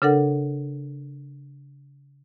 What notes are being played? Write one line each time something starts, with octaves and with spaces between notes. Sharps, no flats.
C#3 D4 A4 A#4 F#5